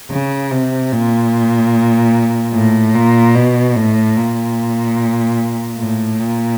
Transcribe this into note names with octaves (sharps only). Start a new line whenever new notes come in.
C#3
C3
A#2
A2
A#2
B2
A2
A#2
A2
A#2